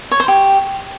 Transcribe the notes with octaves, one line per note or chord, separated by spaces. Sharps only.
C#5
C5
G4